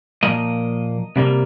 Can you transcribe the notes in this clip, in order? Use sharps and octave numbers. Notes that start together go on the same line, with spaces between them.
A#2 F3 A#3 D#5
C3 G3 A#3